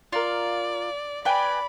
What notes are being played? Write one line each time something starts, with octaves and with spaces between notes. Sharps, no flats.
F4 A#4 D5
B4 D5 G5 G#5 B5